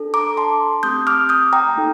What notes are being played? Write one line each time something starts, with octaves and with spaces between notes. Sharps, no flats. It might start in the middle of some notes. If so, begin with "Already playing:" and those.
Already playing: D4 A4
A#5 D6
A5 C6
A3 C4 G4 D#6 G6
D6 F6
D#6 G6
G5 A#5
A#3 D#4 A4